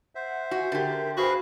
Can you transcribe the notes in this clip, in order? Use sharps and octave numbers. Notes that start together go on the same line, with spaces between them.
C5 E5 F#5
F#4 G#5
D3 G4 A#4
F#4 G#4 B4 C5 F5